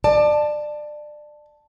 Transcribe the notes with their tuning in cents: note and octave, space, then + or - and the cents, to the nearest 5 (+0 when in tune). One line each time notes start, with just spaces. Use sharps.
D5 +25 A5 +0